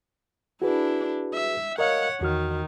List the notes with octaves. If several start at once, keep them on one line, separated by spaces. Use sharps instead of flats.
D4 E4 F#4 G#4 B4
E5
A#4 C#5 D#5 F5 F#5
E2 D#3 F#4 F6